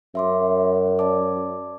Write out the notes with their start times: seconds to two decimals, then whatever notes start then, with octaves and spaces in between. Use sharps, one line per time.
0.15 F#2 E5 C6 D6
0.99 D5 A5 D6